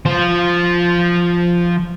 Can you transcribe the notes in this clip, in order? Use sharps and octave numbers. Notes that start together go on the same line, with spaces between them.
F3 C5